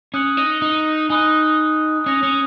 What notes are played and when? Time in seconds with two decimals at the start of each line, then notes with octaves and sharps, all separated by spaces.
0.14 C#4 D#6 F#6 C#7 F#7
0.37 D#4
0.62 D#4
1.10 D#4 G#5 B5 D#6 F#6
2.06 C#4 D#6 A#6 F7
2.23 C#4